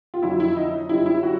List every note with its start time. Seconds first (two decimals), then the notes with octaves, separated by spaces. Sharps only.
0.14 F4
0.22 F2 D3 F#3 E4
0.40 E4
0.56 D#4
0.89 F#2 D3 G3 E4
1.06 E4
1.23 F#4